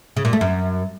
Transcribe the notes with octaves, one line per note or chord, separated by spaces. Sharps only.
C#3
A#2
A3
F#2